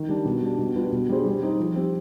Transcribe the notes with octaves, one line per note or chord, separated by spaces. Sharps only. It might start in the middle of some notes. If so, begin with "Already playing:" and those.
Already playing: D#3
G3 D4
B2
G3 D4
B2
G3 D4 F4 B4
B2
G3 D4 G#4 C5
G3
C4 D#4 G4 C5
F3
C4 G4